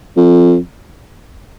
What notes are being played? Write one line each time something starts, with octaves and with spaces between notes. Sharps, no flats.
F2